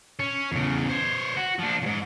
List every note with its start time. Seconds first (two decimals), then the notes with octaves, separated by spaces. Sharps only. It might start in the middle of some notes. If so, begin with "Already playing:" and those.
0.20 C#4
0.52 E2 C#3
0.89 C5 C#5
1.36 F#4
1.59 F3 D4
1.83 E2 G#2